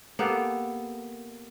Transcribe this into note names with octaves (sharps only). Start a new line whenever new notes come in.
A#3 B3 G4 A4